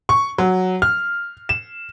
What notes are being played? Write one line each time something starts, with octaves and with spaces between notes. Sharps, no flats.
C#6
F#3
F6
E7